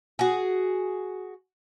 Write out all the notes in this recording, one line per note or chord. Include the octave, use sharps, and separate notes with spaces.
F#4 G#4